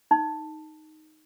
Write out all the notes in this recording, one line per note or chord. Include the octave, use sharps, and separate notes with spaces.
D#4